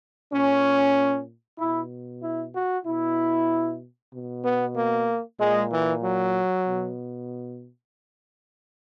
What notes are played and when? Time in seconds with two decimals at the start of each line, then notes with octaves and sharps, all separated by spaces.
0.31 A#2 C#4
1.58 B2 E4
2.22 E4
2.54 F#4
2.85 B2 E4
4.12 B2
4.43 B3
4.76 A#3
5.39 A#2 G#3
5.70 E3
6.02 F#3
6.66 B2